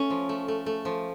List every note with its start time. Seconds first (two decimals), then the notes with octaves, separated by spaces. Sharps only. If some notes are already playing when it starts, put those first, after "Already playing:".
Already playing: A3 C#4
0.10 F3
0.29 A3
0.48 A3
0.66 A3
0.85 F3